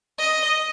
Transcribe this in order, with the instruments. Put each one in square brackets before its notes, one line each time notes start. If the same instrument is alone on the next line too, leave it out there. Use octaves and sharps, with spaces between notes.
[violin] D#5